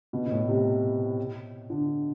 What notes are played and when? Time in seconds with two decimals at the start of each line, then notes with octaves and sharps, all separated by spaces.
0.13 B2
0.26 B2
0.31 A2
0.48 C3
1.70 D3